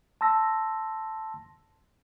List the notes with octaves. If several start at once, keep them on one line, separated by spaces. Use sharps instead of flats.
A5 C6 E6 A#6